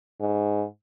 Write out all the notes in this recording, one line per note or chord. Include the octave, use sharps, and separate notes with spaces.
G#2